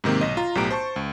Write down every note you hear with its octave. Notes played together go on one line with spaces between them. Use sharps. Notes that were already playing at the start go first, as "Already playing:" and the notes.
G#2 C3 D#3 A#3 C4
B1 D#5
F4 A#5
B1 A2 B3 G4 A#5 D7
C5 A5 C#6
C#2